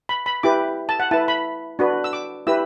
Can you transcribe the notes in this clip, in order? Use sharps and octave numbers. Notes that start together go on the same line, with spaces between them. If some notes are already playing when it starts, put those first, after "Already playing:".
B5
B5
E4 G4 B4 D6
A5
F#5
E4 B4 A5
B5
D4 F#4 B4
E6
D6
E4 G4 B4 E6